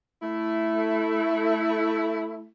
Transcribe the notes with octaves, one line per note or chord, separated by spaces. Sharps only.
A3 E4